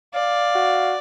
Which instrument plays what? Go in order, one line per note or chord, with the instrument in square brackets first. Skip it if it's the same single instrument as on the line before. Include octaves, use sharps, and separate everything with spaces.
[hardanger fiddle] D5 [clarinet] F5
[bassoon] F#4